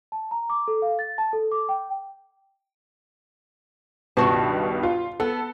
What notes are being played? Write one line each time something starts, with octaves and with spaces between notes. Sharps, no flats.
A5
A#5
D6
A4
F5
A6
A5
A4
D6
G5
C#2 G2 B2 D#3 F#4 A5
F4
B3 A4